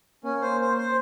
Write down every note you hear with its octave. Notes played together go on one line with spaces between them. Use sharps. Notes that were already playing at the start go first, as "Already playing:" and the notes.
A#3 C#4
C5
C5
C5